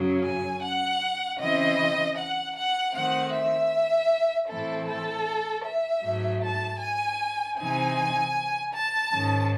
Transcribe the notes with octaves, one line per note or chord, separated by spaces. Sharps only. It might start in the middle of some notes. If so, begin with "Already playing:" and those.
Already playing: F#2 C#3 F#3 C#4
G#5
F#5
C#3 E3 C4 E4 D#5
F#5
F#5
D#3 A3 C4 F#5
E5
A2 E3 A3 C4 E4 A4
A4
E5
G#2 F#3 A3
A5
G#5
C3 E3 C4 D#4 G#5
A5
G#2 D#3 G#3 C#4